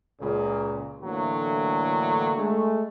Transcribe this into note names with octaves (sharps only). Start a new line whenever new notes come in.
C#2 A#2 C#3
A2 D3 E3 F#3 A3 A#3
G#3 A3